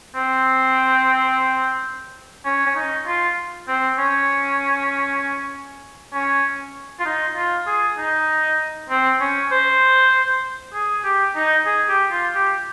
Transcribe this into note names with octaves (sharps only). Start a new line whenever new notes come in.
C4
C#4
C#4
D#4
F4
C4
C#4
C#4
F4
D#4
F4
G#4
D#4
C4
C#4
C5
G#4
G4
D#4
G#4
G4
F4
G4